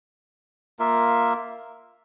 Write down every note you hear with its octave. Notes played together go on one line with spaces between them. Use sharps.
A#3 F4 A#4 E5